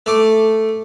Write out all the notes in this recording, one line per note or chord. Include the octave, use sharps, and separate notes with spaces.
A3 D6